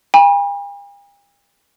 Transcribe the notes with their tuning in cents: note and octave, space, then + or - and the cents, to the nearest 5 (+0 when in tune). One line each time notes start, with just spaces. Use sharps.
G5 +45 B5 -35